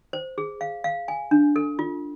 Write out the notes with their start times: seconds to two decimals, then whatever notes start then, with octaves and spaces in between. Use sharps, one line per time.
0.13 C5
0.38 G#4
0.61 F5
0.84 F5
1.08 G#5
1.31 D4
1.56 A4
1.79 F4